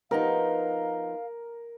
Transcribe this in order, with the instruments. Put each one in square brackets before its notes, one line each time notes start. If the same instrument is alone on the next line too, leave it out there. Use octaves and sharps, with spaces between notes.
[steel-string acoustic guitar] F3 B3 D#4 [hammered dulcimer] A#4 [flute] F5